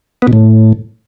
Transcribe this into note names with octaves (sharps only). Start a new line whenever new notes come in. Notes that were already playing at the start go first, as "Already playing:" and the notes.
B3
B2
A2